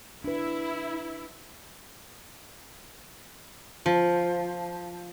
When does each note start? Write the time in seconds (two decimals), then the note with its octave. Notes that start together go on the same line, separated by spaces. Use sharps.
0.24 D4 E4 B4
3.86 F3